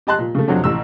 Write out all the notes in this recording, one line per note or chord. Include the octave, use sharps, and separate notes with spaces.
G4 D#5 A5 C6 F#6
A#2
C#3 A3
F2 C3 F#3 D4
A1 E6